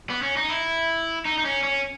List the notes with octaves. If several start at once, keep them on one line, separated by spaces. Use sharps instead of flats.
B3
C#4
D#4
E4
D#4
D#4
C#4
C#4